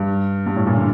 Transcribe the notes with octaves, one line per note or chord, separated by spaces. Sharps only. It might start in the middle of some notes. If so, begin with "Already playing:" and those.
Already playing: G2
G2
A2
A#2
D3